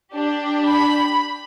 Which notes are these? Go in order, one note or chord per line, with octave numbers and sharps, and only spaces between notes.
D4 G4
B5